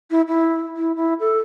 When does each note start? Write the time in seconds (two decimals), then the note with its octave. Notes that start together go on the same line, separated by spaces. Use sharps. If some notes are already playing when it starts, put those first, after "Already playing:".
0.11 E4
0.28 E4
0.76 E4
0.96 E4
1.20 A4